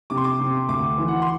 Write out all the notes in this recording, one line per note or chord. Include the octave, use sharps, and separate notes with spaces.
C3 D6
C6
D6
C3
D2 D6
E3
F#5
C6